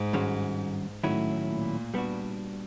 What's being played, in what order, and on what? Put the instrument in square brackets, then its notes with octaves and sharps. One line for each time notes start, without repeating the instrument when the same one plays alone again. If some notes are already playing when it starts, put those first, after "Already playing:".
Already playing: [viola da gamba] G#2
[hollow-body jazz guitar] G2 D#3 G#3 C#4 F#4
[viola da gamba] A2 [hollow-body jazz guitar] D#3 F#3 A3 C#4 E4
[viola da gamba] A#2
[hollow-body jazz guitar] G3 B3 D4 F#4